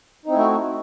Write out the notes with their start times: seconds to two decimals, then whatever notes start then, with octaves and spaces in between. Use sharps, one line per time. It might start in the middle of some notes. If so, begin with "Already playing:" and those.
0.26 D#4
0.29 C4
0.32 E4
0.36 A3
0.39 F#4